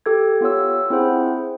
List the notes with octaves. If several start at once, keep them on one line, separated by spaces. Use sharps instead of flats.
G4 A4 G#6
B3 F4 G4 C#5 E6
C4 E4 G#4 C5 F#5